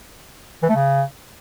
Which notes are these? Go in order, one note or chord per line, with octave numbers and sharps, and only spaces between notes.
E3
A3
C#3